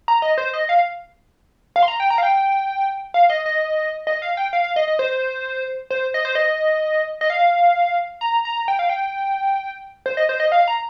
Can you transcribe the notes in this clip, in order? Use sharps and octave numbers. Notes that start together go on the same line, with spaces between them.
A#5
D#5
C5
D#5
F5
F5
C6
A#5
G5
A#5
F5
G5
F5
D#5
D#5
D#5
F5
G5
F5
F5
D#5
D#5
C5
C5
D#5
C5
D#5
D#5
F5
A#5
A#5
G5
F5
G5
C5
D#5
C5
D#5
F5
A#5